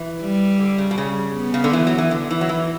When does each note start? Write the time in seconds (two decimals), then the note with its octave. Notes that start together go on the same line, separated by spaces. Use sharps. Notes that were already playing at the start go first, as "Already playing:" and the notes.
Already playing: E3
0.22 G3
0.59 D3
0.78 C#3
0.91 B2
0.98 C#3
1.35 B3
1.54 C#3
1.64 D3
1.73 E3
1.87 F#3
1.98 E3
2.11 D3
2.31 E3
2.41 F#3
2.49 E3